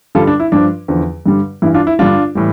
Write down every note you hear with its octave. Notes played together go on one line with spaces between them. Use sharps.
G2 D3 G3 F4 A4
D4
E4
G2 F3 D4
E2 D3 F3
G2 D3 G3
G2 E3 G3 E4
D4 F4
E4
G2 D3 G3 D4 F4
A2 E3 G3